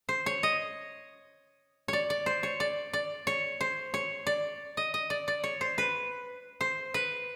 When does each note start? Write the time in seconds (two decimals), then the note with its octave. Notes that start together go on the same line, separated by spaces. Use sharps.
0.09 C5
0.26 C#5
0.43 D#5
1.88 C#5 D5
2.10 D5
2.26 C5
2.43 C#5
2.60 D5
2.93 D5
3.27 C#5
3.61 C5
3.94 C#5
4.27 D5
4.77 D#5
4.94 D#5
5.10 D5
5.28 D5
5.44 C#5
5.61 C5
5.78 B4
6.61 C5
6.94 B4